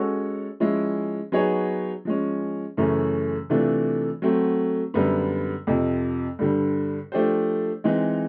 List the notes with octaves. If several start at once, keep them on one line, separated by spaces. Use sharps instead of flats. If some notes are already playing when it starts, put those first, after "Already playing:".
Already playing: G#3 C#4 F#4 A4 C#5
F3 G#3 C#4 E4
F#3 B3 D#4 G#4 C#5
F3 G#3 C#4
F#2 C#3 E3 A3 C#4
C3 E3 A3 D4 F4
F#3 A3 C4
F#2 D3 G3 B3
F2 C3 F3
G2 D3 G3
F3 A3 D4 G4 C5
E3 G#3 C4 D#4